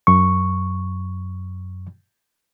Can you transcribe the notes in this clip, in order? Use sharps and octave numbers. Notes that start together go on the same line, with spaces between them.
F#2 C#6